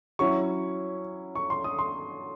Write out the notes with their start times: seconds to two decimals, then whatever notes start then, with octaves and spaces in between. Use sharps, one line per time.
0.19 F#3 C#4 E4 C#6
1.35 C#6
1.50 C6
1.64 D#6
1.79 C6